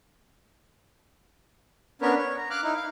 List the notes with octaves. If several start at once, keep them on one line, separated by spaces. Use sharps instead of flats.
B3 C#4 D4 A#4 B4 C#5
C#5
A#5
F5 D6 F6 F#6
D#4 E4
F5